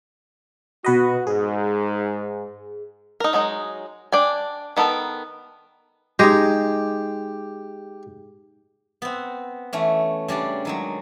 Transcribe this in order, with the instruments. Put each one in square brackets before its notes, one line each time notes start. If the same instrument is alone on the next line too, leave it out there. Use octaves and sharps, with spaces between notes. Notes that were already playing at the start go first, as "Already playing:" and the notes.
[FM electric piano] B2 B4 D#5 [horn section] F#4
[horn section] G#2 [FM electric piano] G#4
[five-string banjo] D#4 A#4
F#3 G#3 D#4
D4 D5 G5 G#5
D#3 B3 A4 A#4 A5
[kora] G#3 D#4 [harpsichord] G4
[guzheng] B3 C4
E3 A3 C#4
C#3 G3 D4 D5
D#3 F#3 G#3